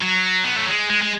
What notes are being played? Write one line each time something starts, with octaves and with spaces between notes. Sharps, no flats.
F#3
B3
A3
G#3
G#3
G#3